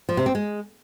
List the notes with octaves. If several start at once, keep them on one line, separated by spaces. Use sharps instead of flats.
F3
C3
C4
G#3